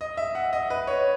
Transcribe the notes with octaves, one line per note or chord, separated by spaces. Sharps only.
D#5
E5
F#5
D#5
B4
C#5